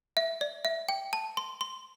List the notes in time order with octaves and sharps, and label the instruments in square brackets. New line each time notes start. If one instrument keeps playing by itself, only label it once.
[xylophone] E5
D5
E5
G5
A5
C6
C6